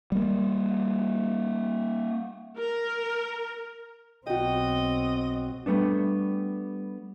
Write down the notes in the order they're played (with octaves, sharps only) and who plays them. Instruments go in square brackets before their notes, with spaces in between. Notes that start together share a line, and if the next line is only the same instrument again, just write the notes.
[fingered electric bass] G3 A#3
[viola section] A#4
[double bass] B1 C4 [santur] F#4 G5 [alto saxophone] D#5
[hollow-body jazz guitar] G3 A3 B3 D4